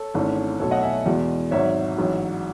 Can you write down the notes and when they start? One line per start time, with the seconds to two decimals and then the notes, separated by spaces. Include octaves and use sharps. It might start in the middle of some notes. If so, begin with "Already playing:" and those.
Already playing: A4 C#5
0.15 G#1 G#2 E3 A3 C#4
0.60 B1 B2 A3 A4 C#5
0.71 D#5 F#5
0.83 E5 G#5
1.06 E2 B2 G#3
1.51 G#1 G#2 F#3 C#5 E5
1.97 A1 G#2 F#3